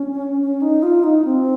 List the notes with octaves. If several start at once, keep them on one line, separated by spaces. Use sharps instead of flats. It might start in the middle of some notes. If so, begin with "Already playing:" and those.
Already playing: C#4
C#4
D#4
F4
D#4
C4